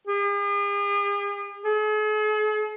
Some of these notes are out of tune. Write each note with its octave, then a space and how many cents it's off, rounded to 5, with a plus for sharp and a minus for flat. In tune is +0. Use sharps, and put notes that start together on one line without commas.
G#4 -45
G#4 +45